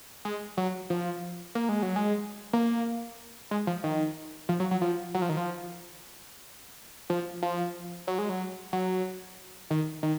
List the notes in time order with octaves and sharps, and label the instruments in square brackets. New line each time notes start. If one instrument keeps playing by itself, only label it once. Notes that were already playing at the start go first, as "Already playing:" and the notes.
[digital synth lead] G#3
F#3
F3
A#3
G#3
F#3
G#3
A#3
G#3
F3
D#3
F3
F#3
F#3
F3
F#3
F3
D#3
F3
F3
F3
F#3
G#3
F#3
F#3
D#3
D#3